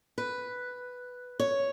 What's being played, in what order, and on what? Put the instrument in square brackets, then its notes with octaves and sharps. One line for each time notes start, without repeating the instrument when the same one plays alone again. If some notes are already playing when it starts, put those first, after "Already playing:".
[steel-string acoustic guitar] B4
C#5